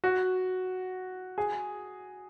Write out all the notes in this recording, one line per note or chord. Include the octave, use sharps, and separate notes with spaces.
F#4
G#4